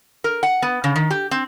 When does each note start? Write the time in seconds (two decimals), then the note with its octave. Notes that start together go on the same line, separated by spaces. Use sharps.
0.24 A#4
0.43 F#5
0.62 B3
0.84 C#3
0.96 D#3
1.10 G4
1.31 C4